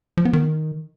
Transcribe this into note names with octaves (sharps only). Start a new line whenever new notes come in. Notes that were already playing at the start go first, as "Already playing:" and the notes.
F3
B3
D#3